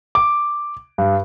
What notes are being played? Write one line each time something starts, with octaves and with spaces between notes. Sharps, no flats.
D6
G2